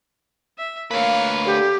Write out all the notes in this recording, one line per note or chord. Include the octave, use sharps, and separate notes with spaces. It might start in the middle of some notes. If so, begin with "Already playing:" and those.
E5
D2 A#3 B4 C#5 F5
D3 G4